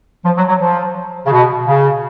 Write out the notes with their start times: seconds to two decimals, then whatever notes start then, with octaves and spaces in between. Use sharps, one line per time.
0.25 F3
0.37 F#3
0.48 F#3
0.60 F3
1.26 C#3
1.32 B2
1.67 C#3